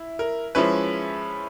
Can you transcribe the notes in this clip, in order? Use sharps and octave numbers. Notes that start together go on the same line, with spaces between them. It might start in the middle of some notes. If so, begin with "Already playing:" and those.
Already playing: E4
A#4
F3 G#3 C#4 E4 B4